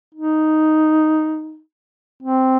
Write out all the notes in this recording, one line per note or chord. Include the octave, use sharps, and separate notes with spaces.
D#4
C4